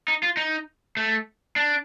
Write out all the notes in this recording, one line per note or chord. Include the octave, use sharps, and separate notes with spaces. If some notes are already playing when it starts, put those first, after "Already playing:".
D#4
F4
D#4
A3
D4